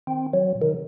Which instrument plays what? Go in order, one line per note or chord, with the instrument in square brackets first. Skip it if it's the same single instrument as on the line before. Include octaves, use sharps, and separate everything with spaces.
[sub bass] D#3 [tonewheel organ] C4
[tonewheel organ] F#3
[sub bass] A#2
[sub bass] C3 [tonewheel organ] D#3